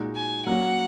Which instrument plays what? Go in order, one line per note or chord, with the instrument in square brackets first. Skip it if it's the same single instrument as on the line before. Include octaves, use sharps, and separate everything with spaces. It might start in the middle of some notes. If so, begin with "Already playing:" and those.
Already playing: [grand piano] A#2 G#3 D#4 F#4
[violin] G#5
[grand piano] F#3 A#3 C#4 F#4 [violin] F#5